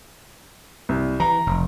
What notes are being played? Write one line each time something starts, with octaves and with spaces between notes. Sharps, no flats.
C2
E3 A#5
F1